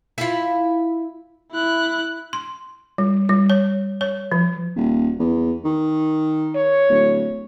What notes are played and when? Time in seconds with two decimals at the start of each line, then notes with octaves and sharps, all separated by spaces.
0.18 E4 F4
1.52 E4 F#6
2.33 C6
2.98 G3
3.29 G3
3.50 C#5
4.01 C#5
4.32 F3
4.76 D#1
5.19 E2
5.64 D#3
6.56 C#5
6.90 D1